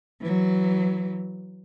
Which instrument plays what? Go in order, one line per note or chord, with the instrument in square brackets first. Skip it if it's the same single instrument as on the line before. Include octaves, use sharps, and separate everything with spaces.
[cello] E3 F#3